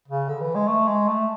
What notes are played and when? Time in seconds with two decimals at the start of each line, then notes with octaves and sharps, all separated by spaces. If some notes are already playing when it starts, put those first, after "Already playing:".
0.08 C#3
0.28 D3
0.41 E3
0.55 G#3
0.67 A3
0.88 G#3
1.08 A3